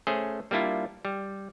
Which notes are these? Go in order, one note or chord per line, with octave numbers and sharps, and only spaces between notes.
A3 C#4 G#4 C5
G3 A#3 D4 E4 F4
G3